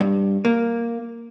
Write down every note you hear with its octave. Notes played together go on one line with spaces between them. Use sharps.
G2
A#3